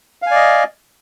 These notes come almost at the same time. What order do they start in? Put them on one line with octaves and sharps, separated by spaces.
F5 G#5 D5 D#5